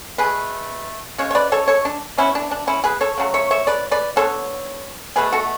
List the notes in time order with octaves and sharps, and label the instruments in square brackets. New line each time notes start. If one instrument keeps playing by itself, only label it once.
[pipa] B2 A3 G#4 B4
C#3 G#3 C#5
C#5
B4 D5
A4 C#5
A4 C#5
D4
E3 B3 C#4 E4
D4
D4
C#4 E4
G#4 B4
A4 C#5
C#3 F#3 A3
C#5 E5
C#5 E5
B4 D5
B4 D5
D3 G#3 B3 A4 C#5
B2 F#3 A3 G#4 B4
F#4 A4